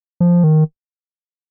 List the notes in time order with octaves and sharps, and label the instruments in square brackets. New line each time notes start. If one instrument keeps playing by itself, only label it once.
[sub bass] F3
D#3